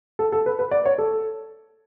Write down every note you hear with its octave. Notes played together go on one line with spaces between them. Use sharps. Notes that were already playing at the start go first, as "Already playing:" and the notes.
A4
A4
B4
B4
D5
C#5
A4